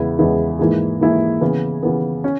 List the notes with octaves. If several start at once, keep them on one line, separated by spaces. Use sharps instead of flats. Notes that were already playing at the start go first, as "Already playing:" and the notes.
Already playing: E2 C#3 G#3 B3 E4
E2 C#3 G#3 B3 E4
G#2 E3 A#3 E4 G#4
G#2 E3 A#3 E4 G#4
C#3 E3 B3
C#3 E3 B3
C#4